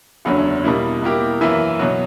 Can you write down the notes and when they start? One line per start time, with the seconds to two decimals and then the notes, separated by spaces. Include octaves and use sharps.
0.25 F#1 E2 D3 F#3 C#4
0.64 B2 G3 A#3 E4
1.02 B2 A#3 E4 G4 A#4
1.41 F#2 E3 A#3 E4
1.79 B2 F#3